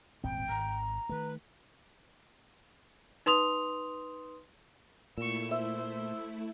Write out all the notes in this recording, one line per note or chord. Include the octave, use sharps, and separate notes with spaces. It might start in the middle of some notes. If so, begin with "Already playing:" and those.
D#1 G#1 C4 G5
G#1 A#5
D#3 A3 B4
D#4 B4 C6 D#6 F7
A#2 A3 E4 C#6 E6
C5 E5